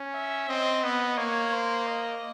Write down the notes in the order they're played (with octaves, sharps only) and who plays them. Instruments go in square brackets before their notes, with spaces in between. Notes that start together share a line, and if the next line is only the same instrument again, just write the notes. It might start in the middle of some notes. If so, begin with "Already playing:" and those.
Already playing: [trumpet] C#4
[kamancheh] E5
[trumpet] C4 [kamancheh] D#5
[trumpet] B3 [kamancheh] D#5
[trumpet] A#3 [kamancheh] C#5
[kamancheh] C5
D#5